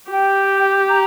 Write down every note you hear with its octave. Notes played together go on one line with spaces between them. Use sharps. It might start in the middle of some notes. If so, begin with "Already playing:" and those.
G4 G5
A#5